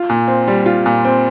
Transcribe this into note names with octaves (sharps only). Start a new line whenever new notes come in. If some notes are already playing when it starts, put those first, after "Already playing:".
Already playing: F4
A#2
C4
G3
F4
A#2
C4